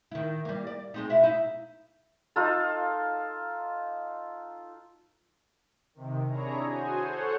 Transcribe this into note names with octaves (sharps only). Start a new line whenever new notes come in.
D#3 E4
G3 A#3
D5
G#3 C4 D#4
B2 E4 E5
D#4 E4
D#4 F4 A4
C3 D#3
D4 E4 G#4 C#5 A#5
F#4 G#4 C5 G#5
A4 C5 C#5 F#5